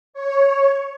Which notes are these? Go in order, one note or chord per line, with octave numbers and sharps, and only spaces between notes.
C#5